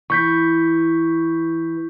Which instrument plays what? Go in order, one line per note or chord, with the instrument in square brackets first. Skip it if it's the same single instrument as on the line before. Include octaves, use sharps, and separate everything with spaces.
[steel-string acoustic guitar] E3 [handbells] C#6 G6 B6